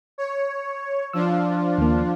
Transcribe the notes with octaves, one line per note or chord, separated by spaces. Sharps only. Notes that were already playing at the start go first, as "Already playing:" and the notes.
C#5
F3 D4 F4 E6
D#2 A#3